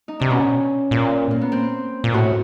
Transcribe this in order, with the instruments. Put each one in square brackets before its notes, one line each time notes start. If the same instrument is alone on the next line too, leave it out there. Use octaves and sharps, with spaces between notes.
[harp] D#4
[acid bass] C3 [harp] D4
[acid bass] B2 [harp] C#4
[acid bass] A#2
[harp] A#3
B3
C4
[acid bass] A#2
[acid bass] A2 [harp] F#4